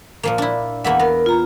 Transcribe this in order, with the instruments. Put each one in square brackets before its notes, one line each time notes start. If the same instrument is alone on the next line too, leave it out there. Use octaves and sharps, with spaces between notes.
[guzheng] A#2 F3 A#3
D4 E4
[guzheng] E2 A#3 E5 [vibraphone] F#5
[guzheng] B3 [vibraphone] A#4
[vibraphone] F4 A#5